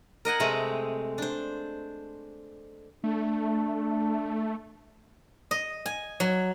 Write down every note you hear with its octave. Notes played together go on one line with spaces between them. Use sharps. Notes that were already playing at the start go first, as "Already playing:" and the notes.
A#4 D#5 F#5 G#5
C3 G#3 A3 C4
D4 C5
A3 D4
D#5
G#5
F#3